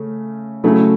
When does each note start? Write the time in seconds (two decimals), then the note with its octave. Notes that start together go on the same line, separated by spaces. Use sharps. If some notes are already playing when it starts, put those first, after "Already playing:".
Already playing: C#3 A3 C#4
0.64 C#3 F#3 A3 E4